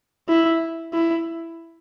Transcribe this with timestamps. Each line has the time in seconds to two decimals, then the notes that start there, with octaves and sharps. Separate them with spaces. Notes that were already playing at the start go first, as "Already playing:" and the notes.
0.28 E4
0.93 E4